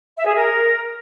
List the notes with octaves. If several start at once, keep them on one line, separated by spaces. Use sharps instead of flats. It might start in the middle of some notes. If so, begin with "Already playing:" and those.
E5
G#4
A#4